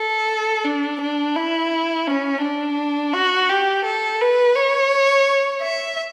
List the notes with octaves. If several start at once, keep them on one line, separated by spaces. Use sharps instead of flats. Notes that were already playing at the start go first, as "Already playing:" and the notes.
Already playing: A4
D4
D4
E4
C#4
D4
F#4
G4
A4
B4
C#5
E5